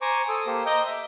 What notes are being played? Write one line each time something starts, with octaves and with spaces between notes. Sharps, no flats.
C5 G#5 A#5 C#6 D6
A4 D#6
A#3 G4 C5
D#5 A#5 D6 G6
E5